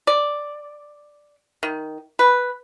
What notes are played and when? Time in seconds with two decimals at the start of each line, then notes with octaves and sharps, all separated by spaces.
0.07 D5
1.63 D#3
2.19 B4